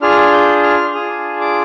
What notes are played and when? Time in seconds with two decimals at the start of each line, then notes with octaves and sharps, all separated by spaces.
0.01 D4 F4 G#4 F6
0.21 F6
0.33 G6
0.63 F6
0.95 D4 F4 G#4 D#6
1.41 D6